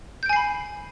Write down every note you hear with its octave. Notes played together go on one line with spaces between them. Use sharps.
G#5 B5 G6 C7 D7